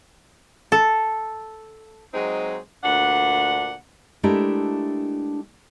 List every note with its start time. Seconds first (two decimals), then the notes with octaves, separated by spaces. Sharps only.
0.72 A4
2.13 F#3 G#3 C4 D#4 G#4
2.83 D2 A#2 D4 F#5
4.23 G#3 A3 D4 E4 G4 A#4